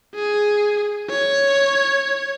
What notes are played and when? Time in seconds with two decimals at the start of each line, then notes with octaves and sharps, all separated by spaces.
0.15 G#4
1.10 C#5